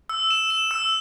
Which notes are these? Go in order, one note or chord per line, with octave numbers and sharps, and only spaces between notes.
E6
E7
E7
E6